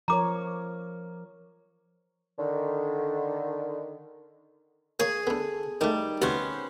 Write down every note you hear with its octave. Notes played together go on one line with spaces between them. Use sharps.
F3 A#4 C#5 A#5 D6
D3 D#3
A#3 G#4 C#5
D3 B3 A4
D#3 G3 A3 D#4
D2 C3 B3 C#4 C5